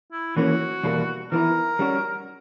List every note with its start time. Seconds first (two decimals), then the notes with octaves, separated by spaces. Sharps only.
0.12 E4
0.36 E3 A#3 C#4 F#4
0.84 E2 B2 G3 A#3
1.32 E3 B3 E4 A#4
1.79 G3 C#4 F#4